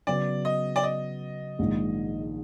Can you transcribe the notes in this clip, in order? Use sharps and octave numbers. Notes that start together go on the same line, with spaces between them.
C#3 F#3 B3 D5
D#5
D5
D#5
A#1 G#2 D#3